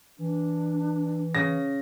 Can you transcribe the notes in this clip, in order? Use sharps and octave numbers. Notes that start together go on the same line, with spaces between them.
E3 D4
C#3 A#6